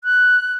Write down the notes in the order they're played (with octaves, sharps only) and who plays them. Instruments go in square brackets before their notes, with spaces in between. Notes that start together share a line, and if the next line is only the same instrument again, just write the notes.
[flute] F#6